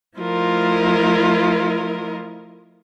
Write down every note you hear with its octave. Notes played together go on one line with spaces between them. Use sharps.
F3 A3 E4 F4 A#4 D#5